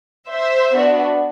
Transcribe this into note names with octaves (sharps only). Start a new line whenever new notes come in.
C5 E5
B3 D4 F#4